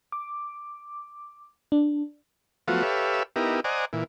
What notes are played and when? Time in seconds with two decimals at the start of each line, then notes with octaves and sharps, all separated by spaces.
0.12 D6
1.72 D4
2.68 F3 F#3 A3 B3 F4 F#4
2.83 G4 A4 B4 C#5 E5 F5
3.36 B3 D#4 E4 G4 A#4
3.64 C5 D5 D#5 F#5 G#5 A#5
3.93 A#2 E3